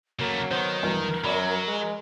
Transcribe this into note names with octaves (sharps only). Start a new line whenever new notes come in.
C#3 F#3 A3 A#3
D#3 B3 C5
B1 E2 G2 A#4
F#2 F#3 D5 B5
G#3